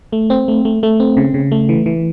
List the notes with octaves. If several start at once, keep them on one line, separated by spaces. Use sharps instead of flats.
A3
C4
A3
A3
A3
C4
C#3
C#3
A3
E3
E3